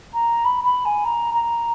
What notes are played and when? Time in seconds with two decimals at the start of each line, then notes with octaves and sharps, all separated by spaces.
0.14 A#5
0.45 B5
0.64 B5
0.85 G#5
1.05 A#5
1.34 A#5